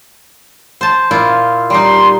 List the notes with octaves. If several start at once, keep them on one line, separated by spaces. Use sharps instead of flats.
C5 A5
A#2 E4 F4
G3 D#4 C6